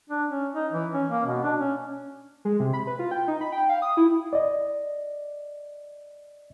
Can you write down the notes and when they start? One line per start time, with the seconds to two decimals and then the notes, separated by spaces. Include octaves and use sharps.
0.10 D4
0.29 C#4
0.55 D#4
0.72 E3
0.94 C#4
1.10 A#3
1.26 B2
1.43 D4
1.59 C#4
2.45 G#3
2.60 C3
2.73 B5
2.87 B4
2.99 F4
3.11 G5
3.28 D#4
3.41 B5
3.52 G5
3.69 F5
3.82 D#6
3.97 E4
4.33 D5 D#5